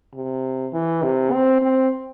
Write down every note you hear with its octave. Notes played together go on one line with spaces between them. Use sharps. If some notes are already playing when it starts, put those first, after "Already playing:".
C3
E3
C3
C4
C4